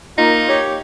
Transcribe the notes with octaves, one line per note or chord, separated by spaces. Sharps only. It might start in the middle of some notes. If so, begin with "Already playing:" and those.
A#3 D#4 F4
G4 C#5